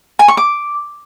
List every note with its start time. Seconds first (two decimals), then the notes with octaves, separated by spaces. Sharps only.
0.19 G#5
0.28 C#6
0.37 D6